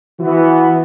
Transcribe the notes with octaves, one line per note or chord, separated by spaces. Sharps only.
E3 B3 F#4